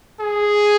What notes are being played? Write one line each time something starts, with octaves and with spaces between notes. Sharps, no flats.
G#4